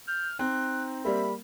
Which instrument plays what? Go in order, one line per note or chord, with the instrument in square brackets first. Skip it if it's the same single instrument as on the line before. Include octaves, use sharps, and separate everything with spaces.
[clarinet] F6 [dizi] G6
[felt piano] C4 [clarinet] D#4 [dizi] F#6
[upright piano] G3 A#3 [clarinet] E5 [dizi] B5